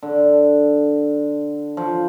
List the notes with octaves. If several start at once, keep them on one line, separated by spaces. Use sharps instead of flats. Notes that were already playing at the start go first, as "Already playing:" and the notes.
D3
F3